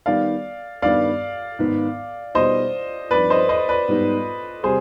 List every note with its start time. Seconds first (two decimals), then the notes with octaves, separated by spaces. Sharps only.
0.06 D#3 G3 B3 D5 F5
0.82 G2 D#3 B3 D5 F5
1.59 G#2 D#3 B3
2.34 B2 G3 B3 D#4 C5 D#5
3.11 G2 F3 C4 D#4 B4 D5
3.30 C5 D#5
3.49 C5 D#5
3.69 B4 D5
3.88 G#2 G3 B3 D#4
4.63 C3 G3 G#4 C5